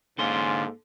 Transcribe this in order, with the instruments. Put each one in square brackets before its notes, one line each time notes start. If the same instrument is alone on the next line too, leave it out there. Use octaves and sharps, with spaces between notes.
[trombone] G#2 [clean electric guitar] D3 A4 C6 [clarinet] A#3 [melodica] C#4 F4